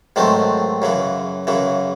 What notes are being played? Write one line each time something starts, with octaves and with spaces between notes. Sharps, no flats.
G#2 D#3 F#3 A3 C4
F#2 C#3 E3
F#2 C#3 E3